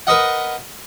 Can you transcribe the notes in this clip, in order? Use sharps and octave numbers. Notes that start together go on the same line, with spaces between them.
A#4 B4 D#5 F#5